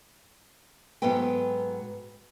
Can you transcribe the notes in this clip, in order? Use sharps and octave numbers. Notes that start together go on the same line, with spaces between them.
G#2 F#3 B3 A4 B4 G5